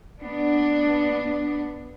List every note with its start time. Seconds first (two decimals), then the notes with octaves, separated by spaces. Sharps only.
0.21 B3 D4